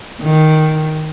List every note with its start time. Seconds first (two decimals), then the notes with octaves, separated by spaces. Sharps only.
0.21 D#3